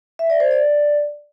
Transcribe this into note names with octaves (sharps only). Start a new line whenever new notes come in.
E5
D5
C5
D5